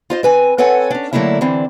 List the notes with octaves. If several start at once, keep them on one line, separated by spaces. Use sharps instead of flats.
F4 C5 D#5
C4 B4 G#5
C4 A4 B4 C#5 F#5 G#5
C#4 D4
D3 F#3 A3 A#3 D4 E4
D3 E3 C4 D4